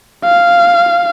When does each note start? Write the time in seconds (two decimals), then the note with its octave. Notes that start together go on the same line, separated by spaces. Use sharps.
0.25 F5